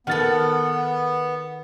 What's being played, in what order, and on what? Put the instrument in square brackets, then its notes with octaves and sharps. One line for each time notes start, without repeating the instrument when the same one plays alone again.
[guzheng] D#3 A4 [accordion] B3 [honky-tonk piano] F#5 F6 A6